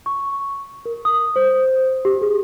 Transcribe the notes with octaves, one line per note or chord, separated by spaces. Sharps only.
C#6
A#4
D#6
C5
G4
G#4